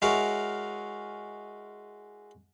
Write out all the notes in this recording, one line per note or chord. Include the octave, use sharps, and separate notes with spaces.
G#3 E4 F#4 A#4 C#5 F5